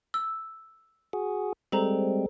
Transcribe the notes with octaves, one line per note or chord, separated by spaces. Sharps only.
E6
F#4 G#4
G3 G#3 C4 A4 C5 A#5